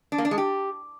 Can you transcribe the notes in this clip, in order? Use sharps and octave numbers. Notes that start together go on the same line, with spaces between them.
D4
A#3
D4
G#3
G4